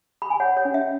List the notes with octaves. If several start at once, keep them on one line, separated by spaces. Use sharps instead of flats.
B5
G#5
C#5 F#5
C#5
C#4
E5